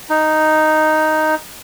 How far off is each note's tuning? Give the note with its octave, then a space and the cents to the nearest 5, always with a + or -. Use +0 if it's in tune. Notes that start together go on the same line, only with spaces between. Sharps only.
D#4 +0